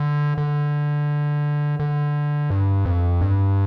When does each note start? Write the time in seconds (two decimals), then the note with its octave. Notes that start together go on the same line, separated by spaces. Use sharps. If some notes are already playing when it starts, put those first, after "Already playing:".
Already playing: D3
0.38 D3
1.80 D3
2.50 G2
2.85 F2
3.21 G2